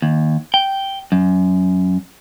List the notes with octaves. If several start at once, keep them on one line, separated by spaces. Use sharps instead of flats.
D#2
G5
F#2